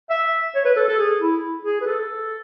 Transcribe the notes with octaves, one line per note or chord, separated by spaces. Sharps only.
E5
C#5
B4
A4
A4
G#4
E4
G#4
B4
A4